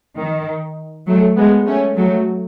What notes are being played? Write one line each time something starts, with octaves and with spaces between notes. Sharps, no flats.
D#3
F#3 A3
G#3 B3
A3 C#4
F#3 A3